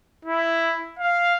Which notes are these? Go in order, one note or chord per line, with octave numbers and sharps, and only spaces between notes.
E4
F5